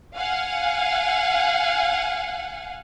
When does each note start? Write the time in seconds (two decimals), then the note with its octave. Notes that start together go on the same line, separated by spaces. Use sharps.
0.16 F5 F#5 G#5